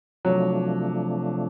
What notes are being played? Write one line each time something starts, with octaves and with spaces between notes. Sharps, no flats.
C3 F3 F#3 A3 D4